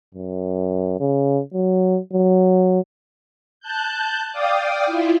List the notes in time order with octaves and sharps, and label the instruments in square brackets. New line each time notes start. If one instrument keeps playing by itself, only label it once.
[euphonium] F#2
C#3
F#3
F#3
[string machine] A5 F#6 G6
D5 F5 G5 D6 D#6
E4 F4